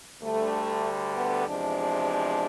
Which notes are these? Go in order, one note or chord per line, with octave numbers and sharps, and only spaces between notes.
D2 D3 G3 A3
B3
E2 C3 F3 G#3 D4